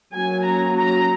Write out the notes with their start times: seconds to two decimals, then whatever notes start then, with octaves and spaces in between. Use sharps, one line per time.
0.14 F#3 A#3 C#4 G#5
0.45 A#5
0.76 A#5